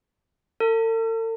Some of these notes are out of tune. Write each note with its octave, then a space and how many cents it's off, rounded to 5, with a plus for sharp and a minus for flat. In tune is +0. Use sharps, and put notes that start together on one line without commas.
A4 +45